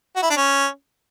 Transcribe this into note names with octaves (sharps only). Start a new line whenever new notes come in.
F#4
E4
D4
C#4